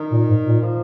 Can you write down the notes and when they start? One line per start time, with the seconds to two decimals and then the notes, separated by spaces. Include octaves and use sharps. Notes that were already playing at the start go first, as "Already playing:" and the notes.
Already playing: D#3
0.11 A#2
0.28 G#2
0.46 A#2
0.63 F3